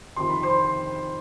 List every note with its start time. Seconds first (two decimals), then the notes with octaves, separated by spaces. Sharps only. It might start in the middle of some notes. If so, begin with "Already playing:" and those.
0.16 F2 C3 D#3 C6
0.29 B5
0.43 C5 C6